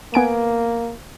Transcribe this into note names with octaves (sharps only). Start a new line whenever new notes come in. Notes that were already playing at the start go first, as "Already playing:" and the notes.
A#3 B3 G#5 D7